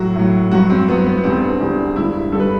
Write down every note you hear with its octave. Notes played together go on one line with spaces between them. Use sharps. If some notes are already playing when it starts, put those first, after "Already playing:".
Already playing: A2 F#3 F#4
A2 F#3
G2 F#3 F#4
C4
G2 F#3 B3
B3
B3
E2 D3 G3 C4
E2 D3 G3
G2 D3 G3 E4
G2 D3 G3 A4
B4